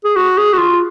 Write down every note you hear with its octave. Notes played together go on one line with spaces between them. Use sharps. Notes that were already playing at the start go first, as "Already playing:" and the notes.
G#4
F#4
G#4
F#4
F4